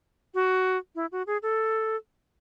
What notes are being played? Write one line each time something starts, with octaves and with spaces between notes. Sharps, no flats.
F#4
E4
F#4
G#4
A4